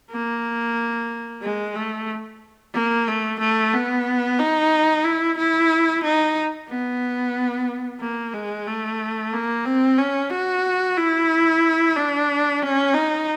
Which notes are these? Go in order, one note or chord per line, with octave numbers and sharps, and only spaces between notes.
A#3
G#3
A3
A#3
A3
A3
B3
D#4
E4
E4
D#4
B3
A#3
G#3
A3
A#3
C4
C#4
F#4
E4
D4
C#4
D#4